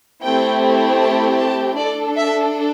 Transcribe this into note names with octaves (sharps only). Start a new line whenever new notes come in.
A3 C4 E4 G4 G5
A5
A5
D4 A4 D5
E5